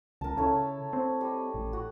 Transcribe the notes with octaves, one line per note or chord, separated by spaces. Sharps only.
C#2 A#4 A5
C#3 E4 A4 C#5
C4
G3 D#5
A1
F#4